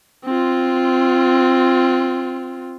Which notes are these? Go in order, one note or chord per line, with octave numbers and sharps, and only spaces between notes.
C4 F4